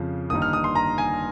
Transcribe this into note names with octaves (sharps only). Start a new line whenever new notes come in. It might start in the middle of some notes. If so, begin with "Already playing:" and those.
Already playing: F2 C#3 F3
G1 G2 D#3 A#3 D#4 D#6
F6
D#6
C6
A#5
G#5